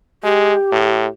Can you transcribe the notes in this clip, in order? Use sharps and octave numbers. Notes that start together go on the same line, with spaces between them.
G#3 G4
A2